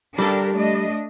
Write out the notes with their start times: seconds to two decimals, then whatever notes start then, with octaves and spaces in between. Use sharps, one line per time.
0.18 G3 D4 G4 A4 A#4
0.58 A3 D4 D#5